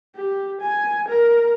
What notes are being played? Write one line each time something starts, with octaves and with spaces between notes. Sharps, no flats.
G4
G#5
A#4